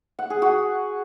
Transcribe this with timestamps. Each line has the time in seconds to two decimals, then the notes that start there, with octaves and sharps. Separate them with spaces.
0.19 F#5
0.30 G#4
0.42 F#4